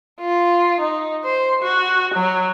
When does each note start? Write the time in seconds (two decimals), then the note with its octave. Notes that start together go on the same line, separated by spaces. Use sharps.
0.21 F4
0.80 D#4
1.25 C5
1.63 F#4
2.14 F#3